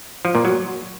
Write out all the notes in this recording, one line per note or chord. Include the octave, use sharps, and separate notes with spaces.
F3
A#2
F#3